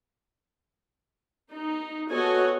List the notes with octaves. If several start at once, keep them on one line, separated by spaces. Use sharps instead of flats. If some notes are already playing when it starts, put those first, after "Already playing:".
D#4
B3 F#4 A4 C#5 D#5 G#5